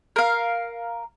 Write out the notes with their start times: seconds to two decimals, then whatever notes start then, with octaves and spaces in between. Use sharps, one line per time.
0.16 A#4 F5